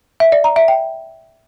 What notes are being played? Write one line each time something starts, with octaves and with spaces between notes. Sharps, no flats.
E5
D5
A#5
E5
G5